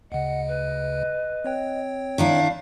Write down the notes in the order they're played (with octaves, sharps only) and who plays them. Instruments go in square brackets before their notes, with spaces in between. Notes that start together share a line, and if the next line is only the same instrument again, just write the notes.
[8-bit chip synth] D2 C#3 [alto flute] D#5 [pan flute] F#5
[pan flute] B4
[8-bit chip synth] C4 C#5 G5
[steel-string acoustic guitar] D#3 D4 E4 [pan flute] F5